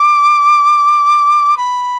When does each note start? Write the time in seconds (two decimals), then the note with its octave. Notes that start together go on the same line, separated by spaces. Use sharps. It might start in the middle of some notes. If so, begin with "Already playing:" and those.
Already playing: D6
1.57 B5